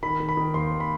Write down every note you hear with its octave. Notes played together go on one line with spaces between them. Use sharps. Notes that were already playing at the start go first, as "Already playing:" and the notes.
D#3 B5
D#3
B5
D#3
D#2 C6
D#2
B5